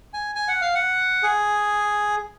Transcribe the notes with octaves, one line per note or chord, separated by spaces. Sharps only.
G#5
G#5
F#5
F5
F#5
G#4